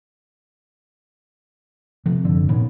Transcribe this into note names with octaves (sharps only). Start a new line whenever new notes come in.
C3 F3
F#1 D3
A#2 D#3 B3 C#4